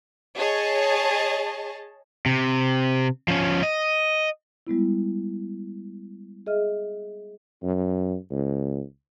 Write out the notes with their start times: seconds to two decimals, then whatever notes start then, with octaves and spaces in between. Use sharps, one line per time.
0.38 G#4 C#5 D#5 A5
2.26 C3
3.28 F3 C#4
3.63 D#5
4.67 G3 G#3 B3 E4
6.46 G#4 D#5 E5 F6
7.63 F#2
8.31 C#2